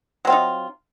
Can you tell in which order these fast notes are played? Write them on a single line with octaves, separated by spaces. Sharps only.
F#3 C4 F4 D#4